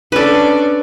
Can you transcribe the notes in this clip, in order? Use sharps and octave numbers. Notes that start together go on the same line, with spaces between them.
C#4 D4 A4 B4 D5